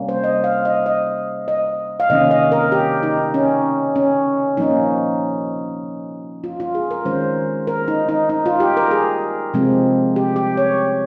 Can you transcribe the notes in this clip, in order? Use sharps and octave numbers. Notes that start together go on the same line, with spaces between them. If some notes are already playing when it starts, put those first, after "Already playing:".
Already playing: C3 G3 A#3 C#4
C5
D#5
F5
D#5
D#5
D#5
F5
C3 D#3 A#3 C#4 D#5
D#5
A#4
G4
D#4
C#4
C#4
F3 A#3 C#4 D#4
F4
F4
G#4
A#4
D#3 G#3 C#4 C5
A#4
D#4
D#4
D#4
F4
G4
A#4
G#4
C3 F3 G#3 C4
G4
G4
C#5